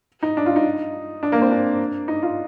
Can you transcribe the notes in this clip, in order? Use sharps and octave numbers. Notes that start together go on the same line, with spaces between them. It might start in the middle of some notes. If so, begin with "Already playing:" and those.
D#4
D4
F4
D#4
D4
A#3
C4
D4
D#4
F4